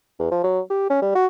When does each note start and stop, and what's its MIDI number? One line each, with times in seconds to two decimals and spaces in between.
0.19 0.28 40
0.31 0.43 53
0.43 0.60 54
0.70 0.88 67
0.90 1.02 61
1.02 1.14 55
1.15 1.26 66